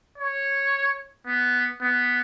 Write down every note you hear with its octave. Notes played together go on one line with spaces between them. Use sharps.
C#5
B3
B3